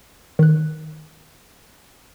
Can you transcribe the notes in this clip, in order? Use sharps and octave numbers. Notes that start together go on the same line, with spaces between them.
D#3 F#6